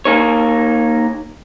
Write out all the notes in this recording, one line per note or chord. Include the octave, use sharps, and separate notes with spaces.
A#3 D#4 C#5